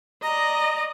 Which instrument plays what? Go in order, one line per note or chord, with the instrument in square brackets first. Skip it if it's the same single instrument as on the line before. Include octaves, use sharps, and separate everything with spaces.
[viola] D5 D#5 [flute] A#5